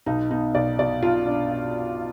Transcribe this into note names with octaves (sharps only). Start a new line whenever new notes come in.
B1 D#4
B3 D#4
B1 D5
B2 D5
B1 F4
B3 D4